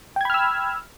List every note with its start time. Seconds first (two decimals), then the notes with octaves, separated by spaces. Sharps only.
0.16 G5
0.21 G#6
0.25 B5
0.30 F6
0.34 E6